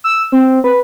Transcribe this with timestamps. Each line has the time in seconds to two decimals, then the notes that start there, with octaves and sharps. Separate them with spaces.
0.04 E6
0.32 C4
0.64 B4